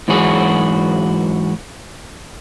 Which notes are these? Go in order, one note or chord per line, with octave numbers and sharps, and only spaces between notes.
G#2 E3 F#3 F#4 G#4